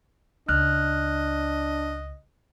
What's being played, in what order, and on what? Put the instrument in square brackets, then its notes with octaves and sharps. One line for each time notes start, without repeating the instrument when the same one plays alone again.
[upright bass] C#2 [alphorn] D4 [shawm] D#5 [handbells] F6 F#6